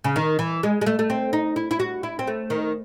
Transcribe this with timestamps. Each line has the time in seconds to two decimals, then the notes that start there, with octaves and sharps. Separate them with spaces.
0.04 C#3
0.16 D#3
0.39 E3
0.63 G#3
0.81 G#3
0.86 A3
0.99 A3
1.10 C4
1.33 D#4
1.56 E4
1.71 E4
1.80 F#4
2.03 E4
2.19 C4
2.27 A3
2.50 D#3